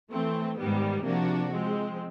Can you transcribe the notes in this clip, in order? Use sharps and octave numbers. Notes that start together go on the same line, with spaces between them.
E3 A3 C4
G#2 D#3 G3 B3
C3 F3 A#3 D4 F#4
F3 G#3 C4